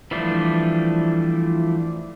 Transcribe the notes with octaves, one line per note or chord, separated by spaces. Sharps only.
E3 F3 G3 A3 D4